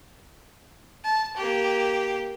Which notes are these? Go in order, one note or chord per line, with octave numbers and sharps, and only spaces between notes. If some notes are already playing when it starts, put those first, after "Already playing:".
A5
A#3 G4